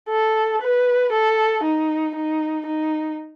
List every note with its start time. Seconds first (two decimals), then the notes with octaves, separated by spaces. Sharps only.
0.09 A4
0.61 B4
1.12 A4
1.64 D#4
2.15 D#4
2.66 D#4